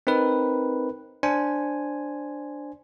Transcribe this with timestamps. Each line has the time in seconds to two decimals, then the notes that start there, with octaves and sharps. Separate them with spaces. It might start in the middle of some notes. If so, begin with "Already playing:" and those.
0.07 C4 D#4 A#4 B4
1.23 D4 C5 G#5